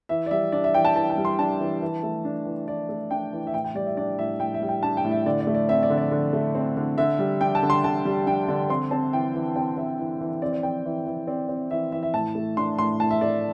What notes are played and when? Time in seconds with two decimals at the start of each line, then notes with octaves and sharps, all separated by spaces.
0.09 E3 E5
0.26 D5
0.31 G3 E5
0.52 D4 D5
0.64 E5
0.74 E3 G5
0.85 A5
0.96 E3 A5
1.10 A5
1.17 G3
1.25 C6
1.39 D4 A5
1.61 E3
1.82 E3
2.03 A3
2.25 D4
2.46 E3
2.67 E3 D5
2.89 A3
3.11 D4 G5
3.33 E3
3.47 E5
3.54 A2 G5
3.64 G5
3.75 G3 D5
3.86 E5
3.97 D4 D5
4.18 A2 E5
4.40 A2 G5
4.54 E5
4.62 G3
4.68 G5
4.83 D4 A5
4.97 G5
5.04 A2
5.11 E5
5.26 D3 D5
5.41 D5
5.47 A3
5.54 D5
5.69 C4 E5
5.83 D5
5.90 D3
5.98 D5
6.11 D3
6.33 A3
6.55 C4
6.77 D3
6.98 D3 E5
7.19 G3
7.41 D4 G5
7.55 A5
7.63 D3
7.70 C6
7.84 D3 A5
8.05 G3
8.27 D4 G5
8.48 D3 D5
8.70 C4 C6
8.91 C4 A5
9.13 E3 G5
9.34 E3
9.56 C4 G5
9.77 C4 E5
9.99 E3
10.21 E3
10.42 C4 D5
10.53 D5
10.63 C4 G5
10.85 E3
11.06 E3
11.27 C4 D5
11.49 C4
11.71 E3 E5
11.92 E3 E5
12.03 E5
12.14 A2 A5
12.35 A3
12.57 D4 C6
12.79 A2 C6
13.00 A2 A5
13.11 E5
13.21 A3 D5